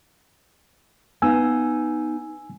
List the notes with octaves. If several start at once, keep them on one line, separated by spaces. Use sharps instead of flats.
B3 D#4 F5 G#5 E6